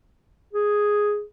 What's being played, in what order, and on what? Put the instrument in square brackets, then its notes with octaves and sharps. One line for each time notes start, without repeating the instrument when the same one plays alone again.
[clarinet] G#4